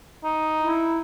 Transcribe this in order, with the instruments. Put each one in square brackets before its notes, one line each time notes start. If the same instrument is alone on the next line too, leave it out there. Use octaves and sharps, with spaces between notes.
[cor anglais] D#4
[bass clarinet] E4